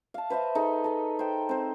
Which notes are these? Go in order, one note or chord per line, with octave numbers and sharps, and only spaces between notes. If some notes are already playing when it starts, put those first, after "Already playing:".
F5 A5
B4 C5 D#5 E5
D#4 G#4 A4 B4
A4 D#5
C5 G5
C4 C5